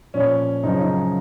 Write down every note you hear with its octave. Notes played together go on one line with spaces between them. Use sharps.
A#2 F3 C#4
F#2 C#3 F3 D#4
C#4
D#4